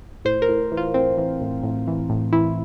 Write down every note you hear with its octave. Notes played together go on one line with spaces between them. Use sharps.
A2 C5
A#4
A2
E3
F4
A2 C4
E3
A2
A2
E3
A2
E3 E4